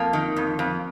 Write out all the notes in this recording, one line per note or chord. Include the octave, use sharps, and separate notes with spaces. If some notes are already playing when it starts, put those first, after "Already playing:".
Already playing: F2 A#3
D#3
F2
F2